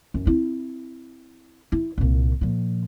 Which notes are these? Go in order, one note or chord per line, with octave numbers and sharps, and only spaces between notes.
F#2
C4 E4
E4
C2 A#2
A#2 F3